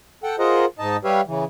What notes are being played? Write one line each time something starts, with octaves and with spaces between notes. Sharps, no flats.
A4 F#5 G5
F4 G#4 A#4 C5 D#5 F#5
G#2 D#4 D#5 A5
G3 G4 B4 C#5 E5 F5
C#3 E3